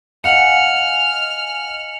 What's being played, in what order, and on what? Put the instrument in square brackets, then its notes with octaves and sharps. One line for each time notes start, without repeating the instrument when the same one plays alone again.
[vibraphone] D#5 G#5 [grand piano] F5 F#5 [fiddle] F6 [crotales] C#7 F#7